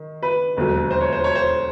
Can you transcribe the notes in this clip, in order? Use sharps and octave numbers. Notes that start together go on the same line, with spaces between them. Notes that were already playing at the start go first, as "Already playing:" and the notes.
Already playing: D#3
B4
E1 D#2 D3 F#3
C5
C#5
C5
C#5
C5